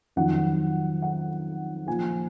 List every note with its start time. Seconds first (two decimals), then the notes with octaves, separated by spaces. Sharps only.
0.16 F2 D#3 F#3 F#5
1.02 F#5
1.87 A#2 F3 G#5